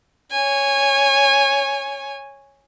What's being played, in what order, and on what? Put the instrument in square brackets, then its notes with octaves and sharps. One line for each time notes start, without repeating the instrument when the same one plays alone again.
[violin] C#5 G#5